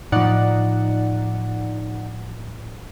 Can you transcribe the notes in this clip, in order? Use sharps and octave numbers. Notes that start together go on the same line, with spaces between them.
A2 F3 D#4 D5 F#5